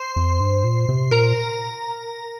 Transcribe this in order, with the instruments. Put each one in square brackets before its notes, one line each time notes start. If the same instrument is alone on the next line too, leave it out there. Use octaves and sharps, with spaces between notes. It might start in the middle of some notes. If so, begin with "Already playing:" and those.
Already playing: [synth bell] C5 C6
[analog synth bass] F2
G2
A#2
C3
[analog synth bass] A#2 [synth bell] A#4 A#5